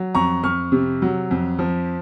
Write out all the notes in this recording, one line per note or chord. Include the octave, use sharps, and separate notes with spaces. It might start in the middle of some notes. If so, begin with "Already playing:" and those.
Already playing: F#3
F2 A#5 C#6
F2 C#6 F6
C3
F#3
F2
F3